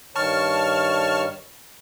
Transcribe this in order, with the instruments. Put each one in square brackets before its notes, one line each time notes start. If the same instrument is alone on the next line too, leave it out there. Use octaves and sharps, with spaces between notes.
[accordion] G2 D#3 C#5 [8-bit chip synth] A5 C#6 F6